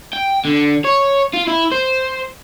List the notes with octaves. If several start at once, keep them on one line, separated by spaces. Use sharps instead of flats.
G5
D3
C#5
F4
E4
C5